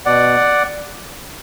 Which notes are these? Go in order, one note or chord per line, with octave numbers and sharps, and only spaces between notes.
B2 D5 F#5